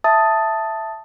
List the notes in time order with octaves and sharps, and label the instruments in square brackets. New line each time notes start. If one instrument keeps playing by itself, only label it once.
[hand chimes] E5 A5 D#6 A6